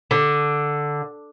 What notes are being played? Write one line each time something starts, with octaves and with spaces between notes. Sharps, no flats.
D3